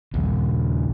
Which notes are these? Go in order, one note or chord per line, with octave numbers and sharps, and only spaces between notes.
A#1 D#2